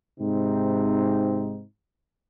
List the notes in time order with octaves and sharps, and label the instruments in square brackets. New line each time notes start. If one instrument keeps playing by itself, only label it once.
[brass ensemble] G#2 C3 C4 D#4